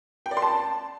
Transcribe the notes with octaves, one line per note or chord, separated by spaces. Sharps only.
G5
D5
C6
A5